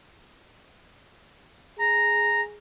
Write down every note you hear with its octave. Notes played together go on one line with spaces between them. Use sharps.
G#4 A#5